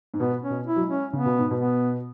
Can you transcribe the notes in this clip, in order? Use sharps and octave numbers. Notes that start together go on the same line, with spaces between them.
G#2
B2 B3
C#4
B2
E4
F#3
G#3
C#4
C#3 B3
B2
G#2
B2
B3